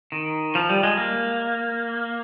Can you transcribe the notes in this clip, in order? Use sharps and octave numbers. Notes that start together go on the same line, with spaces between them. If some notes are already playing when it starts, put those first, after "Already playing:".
D#3
F3
G3
G#3
A#3